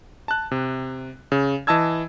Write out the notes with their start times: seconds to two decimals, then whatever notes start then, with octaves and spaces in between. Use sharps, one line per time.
0.28 A5 F#6
0.51 C3
1.32 C#3
1.67 E3 D#5 A5 E6 G#6